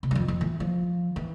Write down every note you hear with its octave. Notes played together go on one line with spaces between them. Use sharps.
C3
G2
F2
F2
E3
F3
E3